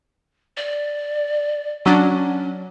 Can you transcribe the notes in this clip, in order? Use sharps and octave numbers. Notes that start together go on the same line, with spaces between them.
D5
F#3 C#4 D4